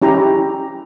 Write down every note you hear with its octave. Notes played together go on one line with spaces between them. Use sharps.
C#4 E4 G4 A#5